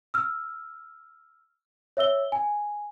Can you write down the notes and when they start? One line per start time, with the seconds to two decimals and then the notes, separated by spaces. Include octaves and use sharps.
0.14 E6 F6
1.97 C#5 E5 E6 G7
2.32 G#5